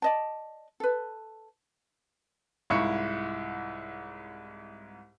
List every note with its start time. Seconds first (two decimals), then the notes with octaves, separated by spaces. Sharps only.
0.02 D5 D#5 A5
0.80 A4 B4
2.70 C2 G#2 E4 F4 C#6 C#7